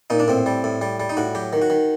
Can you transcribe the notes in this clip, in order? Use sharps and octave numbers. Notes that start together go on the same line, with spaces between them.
A#2 D#4
D4
A2 C4
G3
A2
G3
G3
D#4
A2 F#4
F#3 G4
D#3
F#4
D#3